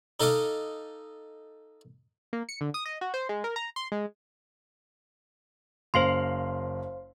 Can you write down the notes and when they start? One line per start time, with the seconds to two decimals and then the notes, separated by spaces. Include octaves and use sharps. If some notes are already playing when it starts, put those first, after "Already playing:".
0.20 D#4 A4 D#5 F5 D6
2.33 A#3
2.49 C#7
2.61 D3
2.74 D#6
2.85 D#5
3.01 F#4
3.14 C5
3.29 G#3
3.44 A#4
3.56 A#5
3.76 C6
3.92 G#3
5.94 F#1 C5 F5 C6 C7 F#7